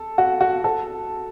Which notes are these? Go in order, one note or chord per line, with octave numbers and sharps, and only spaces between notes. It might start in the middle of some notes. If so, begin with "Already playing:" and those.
Already playing: A4
F#4
F#4
A4